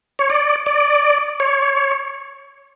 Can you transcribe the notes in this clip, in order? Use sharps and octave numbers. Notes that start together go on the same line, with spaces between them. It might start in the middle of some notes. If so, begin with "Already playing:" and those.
C#5
D5
D5
C#5